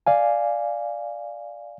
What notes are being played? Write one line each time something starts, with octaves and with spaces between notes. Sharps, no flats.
D5 F5 G#5